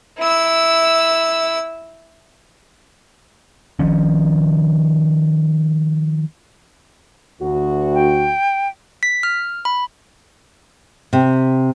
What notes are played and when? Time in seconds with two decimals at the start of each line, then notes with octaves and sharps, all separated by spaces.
0.18 E4 E6
3.79 D#3 F3 C#4
7.41 D2 F#4
7.94 G5
9.03 B6
9.23 F6
9.65 B5
11.13 C3